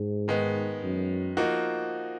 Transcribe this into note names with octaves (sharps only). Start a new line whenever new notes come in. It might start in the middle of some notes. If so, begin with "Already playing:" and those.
Already playing: G#2
D#3 G#3 B3
F#2
F3 A#3 D#4 F#4